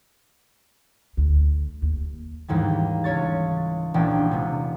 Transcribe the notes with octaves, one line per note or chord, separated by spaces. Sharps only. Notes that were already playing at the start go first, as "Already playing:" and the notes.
D2
D#2
D#2 G#2 E3 G3
C#2 C#4 C#5 C#6 A6
E1 A#1 E3 C#4 D5 G5
C3 G#3 B3